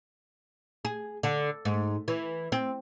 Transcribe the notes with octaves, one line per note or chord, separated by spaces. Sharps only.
G#4
D3
G#2
E3
C4